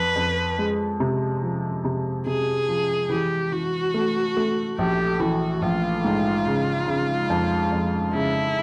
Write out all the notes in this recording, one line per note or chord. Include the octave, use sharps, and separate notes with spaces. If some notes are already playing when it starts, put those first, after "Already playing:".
Already playing: F2 B4
F2
G#3
C3
F3
C3
C3 G#4
F3
E3 G4
E3 F#4
A3
A3
A#1 G4
E3 F#4
A#1 F4
G#2
C#3
C#3
F2
F2
C#3 E4